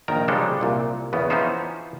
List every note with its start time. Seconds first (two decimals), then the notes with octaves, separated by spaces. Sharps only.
0.08 A#1 D#3 A#4 A#5
0.28 C#3 F3 G3 G#3 D4 A4
0.61 C2 A#2
1.13 E2 C#3 B3
1.30 E3 F3 B3 C#4 D#4 C5